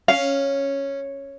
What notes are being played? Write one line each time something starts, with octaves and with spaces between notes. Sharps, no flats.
C#4 F5